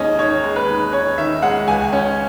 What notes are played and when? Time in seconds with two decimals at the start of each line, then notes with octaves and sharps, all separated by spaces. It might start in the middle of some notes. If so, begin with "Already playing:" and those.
Already playing: D#2 G#3 C#4 D#5
0.19 D#3 C#5
0.44 G#3
0.56 B4
0.68 D#2
0.93 C#4 C#5
1.18 D#3 E5
1.42 G#3 F#5
1.68 C#2 G#5
1.93 C#4